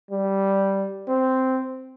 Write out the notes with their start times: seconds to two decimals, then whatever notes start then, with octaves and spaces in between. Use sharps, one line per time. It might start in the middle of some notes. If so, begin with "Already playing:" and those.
0.11 G3
1.08 C4